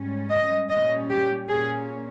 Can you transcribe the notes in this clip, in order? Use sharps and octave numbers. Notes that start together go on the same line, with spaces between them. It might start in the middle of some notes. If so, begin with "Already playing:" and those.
Already playing: G#2 G3 C#4
D#5
A#2 G3 C#4 D#5
G4
A#2 A#3 C#4 G#4